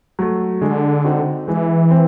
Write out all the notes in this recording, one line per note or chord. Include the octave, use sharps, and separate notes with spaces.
F#3 A3
D3 G#3
C4 D#4 F#4
E3 G#3
C4